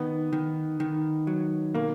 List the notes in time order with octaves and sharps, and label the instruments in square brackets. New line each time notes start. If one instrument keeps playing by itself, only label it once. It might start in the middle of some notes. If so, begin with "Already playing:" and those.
Already playing: [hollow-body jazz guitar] D#3 [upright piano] B3
[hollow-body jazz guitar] D#3
D#3
F#3
[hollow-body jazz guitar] B2 [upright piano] A#3